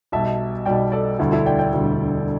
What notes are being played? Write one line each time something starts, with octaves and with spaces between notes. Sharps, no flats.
B1 B2 G3 E5 A5
B1 B2 G3 D5 G5
A4 D5
E1 D2 D3 G3 E4 A4
E4 A4
D5 G5
D5 G5
E1 D2 D3 G3